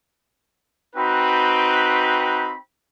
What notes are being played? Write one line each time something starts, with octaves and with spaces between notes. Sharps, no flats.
C4 D#4 F#4 B4 G5 B5